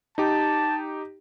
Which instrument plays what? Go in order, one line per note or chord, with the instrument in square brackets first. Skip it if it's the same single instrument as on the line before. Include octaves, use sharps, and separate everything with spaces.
[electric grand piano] D#4 G4 [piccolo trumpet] A5